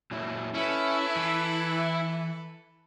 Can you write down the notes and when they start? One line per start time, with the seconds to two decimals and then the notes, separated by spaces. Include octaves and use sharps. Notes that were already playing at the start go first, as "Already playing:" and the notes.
0.11 A#2 F#3 E4
0.54 C#4 E4 A4 B4
1.16 E3